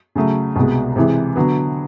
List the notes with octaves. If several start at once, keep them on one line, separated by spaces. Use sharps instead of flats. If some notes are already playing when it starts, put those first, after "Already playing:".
C#3 F#3 A3
C2 B2 G#3
C3 E3 G#3
D3 F#3 B3